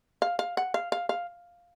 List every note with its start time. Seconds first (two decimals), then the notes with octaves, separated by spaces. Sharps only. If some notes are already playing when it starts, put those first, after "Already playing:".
0.22 F5
0.39 F5
0.57 F#5
0.74 F5
0.92 F5
1.09 F5